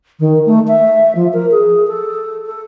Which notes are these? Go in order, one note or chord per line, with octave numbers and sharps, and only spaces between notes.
D#3
A3
E5
F3
A#4
G#4
A4
A4